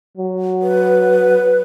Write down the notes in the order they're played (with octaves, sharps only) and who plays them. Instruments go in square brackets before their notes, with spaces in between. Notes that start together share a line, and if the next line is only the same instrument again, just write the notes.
[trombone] F#3
[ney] B4